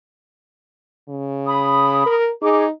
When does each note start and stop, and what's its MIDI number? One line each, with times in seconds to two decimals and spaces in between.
1.09 2.02 49
1.46 2.12 83
1.46 2.12 87
2.06 2.31 70
2.42 2.70 63
2.42 2.64 68
2.42 2.64 86